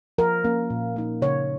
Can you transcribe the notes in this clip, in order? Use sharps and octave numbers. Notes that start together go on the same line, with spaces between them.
F3 A#4
A#3 C#4
A#2
A#3 D#4
C#3 C#5